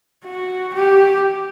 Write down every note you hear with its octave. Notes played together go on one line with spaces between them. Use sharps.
F#4
G4